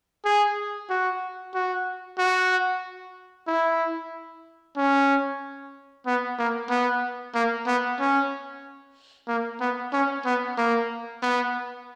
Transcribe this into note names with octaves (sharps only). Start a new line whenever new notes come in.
G#4
F#4
F#4
F#4
E4
C#4
B3
A#3
B3
A#3
B3
C#4
A#3
B3
C#4
B3
A#3
B3